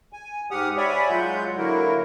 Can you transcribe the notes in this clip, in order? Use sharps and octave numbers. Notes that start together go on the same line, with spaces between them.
G#5
G#2 G4 F#5 D#6 F6
C#5 D5 E5 G#5 B5
F#3 G#3 F4 F#5 G6
D3 F#3 A#3 E4 F#4 A#4